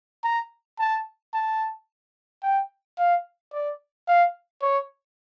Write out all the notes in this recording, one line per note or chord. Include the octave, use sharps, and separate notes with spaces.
A#5
A5
A5
G5
F5
D5
F5
C#5